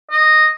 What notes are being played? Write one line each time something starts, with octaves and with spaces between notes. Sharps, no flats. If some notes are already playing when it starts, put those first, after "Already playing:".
D#5